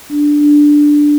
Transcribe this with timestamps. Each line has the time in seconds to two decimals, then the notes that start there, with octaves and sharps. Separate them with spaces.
0.10 D4
0.41 D4